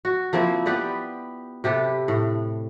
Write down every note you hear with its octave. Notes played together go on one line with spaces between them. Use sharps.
F#4
F3 A#3 C4 E4
B3 G4 B4 D5
C3 G4 A4 B4
A2